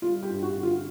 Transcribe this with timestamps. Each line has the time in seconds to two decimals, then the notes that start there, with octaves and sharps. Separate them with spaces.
0.02 G3 F4
0.23 G4
0.30 G2
0.43 F#4
0.56 D3
0.63 F4